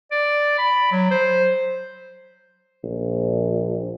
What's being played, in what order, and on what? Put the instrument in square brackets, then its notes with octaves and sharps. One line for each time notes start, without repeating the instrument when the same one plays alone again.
[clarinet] D5
B5
F#3
C5
[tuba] A#1